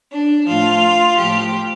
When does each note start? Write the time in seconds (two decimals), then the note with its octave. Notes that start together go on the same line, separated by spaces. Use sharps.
0.11 D4
0.46 A2 F3 F4
1.17 A2 F3 G4